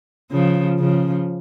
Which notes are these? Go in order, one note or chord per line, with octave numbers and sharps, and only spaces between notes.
C#3 F3
C#3 F3